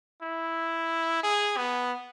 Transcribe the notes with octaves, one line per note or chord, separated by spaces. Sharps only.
E4
G#4
B3